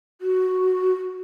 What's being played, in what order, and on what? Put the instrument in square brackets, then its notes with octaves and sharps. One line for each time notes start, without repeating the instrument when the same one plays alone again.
[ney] F#4